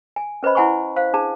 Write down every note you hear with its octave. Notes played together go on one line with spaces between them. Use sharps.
G#5
C#4 B4 C5 D#5 B5
E4 F#5 G#5 B5 C#6
C5 F5
D4 G#4 A5